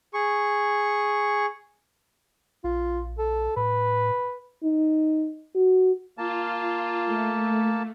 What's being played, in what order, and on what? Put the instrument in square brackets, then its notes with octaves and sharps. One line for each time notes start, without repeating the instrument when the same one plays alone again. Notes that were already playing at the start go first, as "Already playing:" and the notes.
[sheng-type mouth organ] G#4 C#6
[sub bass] A#1 [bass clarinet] F4
[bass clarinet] A4
[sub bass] A2 [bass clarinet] B4
[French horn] D#4
F#4
[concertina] A#3 A5 [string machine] F4
[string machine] A3